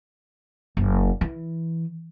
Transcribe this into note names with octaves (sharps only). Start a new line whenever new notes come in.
F#1
E3